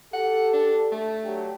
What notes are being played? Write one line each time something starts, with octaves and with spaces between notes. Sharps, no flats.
G4 A4 F#5
D4
A3
F#3 D4 G4